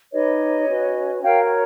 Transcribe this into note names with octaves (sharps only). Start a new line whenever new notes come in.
D#4 G4 B4 C#5 D#5
C#4 F#4 B4
F#4 A#4 C#5 F5 G5